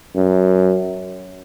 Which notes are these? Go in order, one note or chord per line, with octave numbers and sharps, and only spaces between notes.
F#2